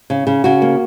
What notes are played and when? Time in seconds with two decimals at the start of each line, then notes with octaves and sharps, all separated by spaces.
0.10 C#3
0.27 C#3
0.44 C#3 F#4
0.62 A#3